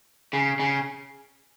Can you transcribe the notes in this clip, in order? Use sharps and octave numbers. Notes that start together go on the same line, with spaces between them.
C#3
C#3